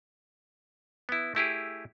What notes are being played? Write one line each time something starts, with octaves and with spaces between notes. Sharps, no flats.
B3 E4
A3 E4 G4 G#4